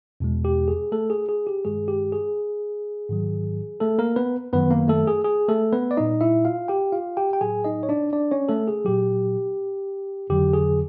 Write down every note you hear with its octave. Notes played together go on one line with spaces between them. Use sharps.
E2 B2 G#3
G4
G#4
A3 A4
G#4
G#4
G4
G2 D#3 G#3 G#4
G4
G#4
G#2 D#3 F#3
A3 A4
A#3 A#4
B3 B4
F#2 D#3 F#3 B3 B4
A#3 A#4
A3 A4
G#4
G#4
A3 A4
B3 B4
D5
A#2 G3 D#4 D#5
E4 E5
F4 F5
G4 G5
F4 F5
G4 G5
G5
A2 F#3 G#4 G#5
D#4 D#5
C#5
D4 D5
D4 D5
C#4 C#5
A3 A4
G#4
A#2 F#3 G4
F2 D3 F#3 G4
G#4